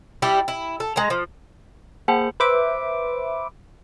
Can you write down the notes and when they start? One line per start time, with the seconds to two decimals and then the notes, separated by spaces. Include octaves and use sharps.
0.22 G3 E4 G4
0.48 E4
0.80 A4
0.96 G#3 A#5
1.10 F3
2.08 A#3 G#4 C5 F#5 G5 A5
2.40 B4 C5 E5 D6